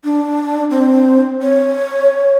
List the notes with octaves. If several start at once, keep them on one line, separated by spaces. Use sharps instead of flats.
D4
C4
C#5